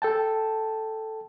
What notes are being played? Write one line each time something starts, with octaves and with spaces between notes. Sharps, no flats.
A4 G5 A5